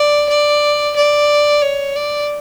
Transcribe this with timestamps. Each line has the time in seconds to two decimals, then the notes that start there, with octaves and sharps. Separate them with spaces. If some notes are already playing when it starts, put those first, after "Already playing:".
Already playing: D5
0.30 D5
0.96 D5
1.62 C#5
1.96 D5